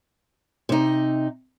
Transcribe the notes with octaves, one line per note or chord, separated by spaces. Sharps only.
C3 D#4